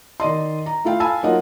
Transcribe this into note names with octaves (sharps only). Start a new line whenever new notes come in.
D#3 D5 D#5 C6
A#5
A3 E4 F4 F5 G5
F5 G#5 A5 B5 E6
F#3 A#3 D#4 F4 D#5 F#5